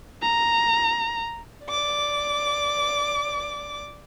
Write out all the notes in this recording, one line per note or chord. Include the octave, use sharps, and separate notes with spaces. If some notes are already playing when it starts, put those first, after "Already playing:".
A#5
D5 D6